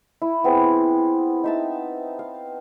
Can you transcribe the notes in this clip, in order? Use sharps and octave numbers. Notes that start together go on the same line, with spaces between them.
E4
B3 C4 G#4
D#4 E5 A5
F5